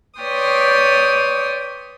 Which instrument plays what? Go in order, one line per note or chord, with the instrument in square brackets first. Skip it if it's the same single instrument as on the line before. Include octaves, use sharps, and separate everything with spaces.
[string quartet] B4 C#5 D5 G5 C6 D#6